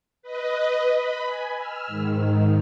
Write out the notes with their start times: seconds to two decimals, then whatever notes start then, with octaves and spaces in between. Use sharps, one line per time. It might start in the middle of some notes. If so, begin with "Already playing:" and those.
0.22 B4 D#5
0.92 B5
1.26 G#5
1.57 E6 F6
1.87 G#2 D#3